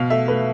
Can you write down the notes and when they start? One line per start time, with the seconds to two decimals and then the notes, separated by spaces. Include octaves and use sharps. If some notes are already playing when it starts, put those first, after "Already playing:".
Already playing: B2 F5
0.10 A3 E5
0.28 A3 B4